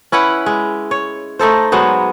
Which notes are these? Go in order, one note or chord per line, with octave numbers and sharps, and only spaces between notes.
C#4 E4 B4 F#5
G#3
C#5
A3 D#4 A4 C5
F#3 G#3 B3 C5